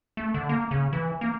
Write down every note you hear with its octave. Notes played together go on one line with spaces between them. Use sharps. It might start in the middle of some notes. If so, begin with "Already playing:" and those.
A3
D3
A#3
C#3
E3
A#3